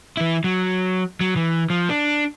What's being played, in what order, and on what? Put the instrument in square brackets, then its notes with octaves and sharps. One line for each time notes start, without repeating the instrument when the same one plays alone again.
[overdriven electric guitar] E3 E4
F#3
F#3
E3
F3
D4